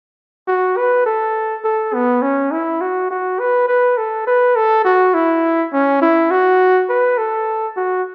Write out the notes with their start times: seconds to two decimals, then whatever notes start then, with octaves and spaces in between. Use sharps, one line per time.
0.48 F#4
0.77 B4
1.06 A4
1.64 A4
1.94 B3
2.22 C#4
2.52 E4
2.81 F#4
3.11 F#4
3.40 B4
3.68 B4
3.98 A4
4.27 B4
4.56 A4
4.85 F#4
5.14 E4
5.73 C#4
6.02 E4
6.31 F#4
6.89 B4
7.18 A4
7.77 F#4